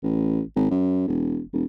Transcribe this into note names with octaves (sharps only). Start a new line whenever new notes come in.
A1
G#1
F#2
E1
E1